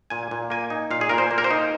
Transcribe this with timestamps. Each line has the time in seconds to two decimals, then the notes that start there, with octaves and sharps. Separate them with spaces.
0.10 A#2 G#5
0.31 A#2
0.50 A#3 G#5
0.70 D#4
0.91 A#2 F5
1.01 G#4
1.09 A#2 A#4
1.18 C5
1.31 A#3
1.38 A#4
1.44 C5
1.51 D#4